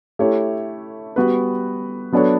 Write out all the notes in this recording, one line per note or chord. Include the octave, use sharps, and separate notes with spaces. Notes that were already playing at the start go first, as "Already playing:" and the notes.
A3 E4 G4 C#5
G3 B3 F#4 B4
F#3 B3 D4 A4 C#5